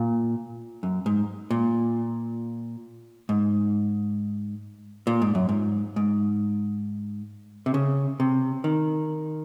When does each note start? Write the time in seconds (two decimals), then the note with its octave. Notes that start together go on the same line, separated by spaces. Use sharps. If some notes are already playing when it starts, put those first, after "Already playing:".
Already playing: A#2
0.83 F#2
1.06 G#2
1.51 A#2
3.29 G#2
5.07 A#2
5.22 G#2
5.35 F#2
5.49 G#2
5.96 G#2
7.66 C3
7.74 C#3
8.20 C3
8.64 D#3